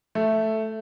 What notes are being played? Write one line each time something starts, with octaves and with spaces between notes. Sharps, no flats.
A3